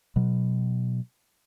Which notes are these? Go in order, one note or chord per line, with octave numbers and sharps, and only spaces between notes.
B2 F#3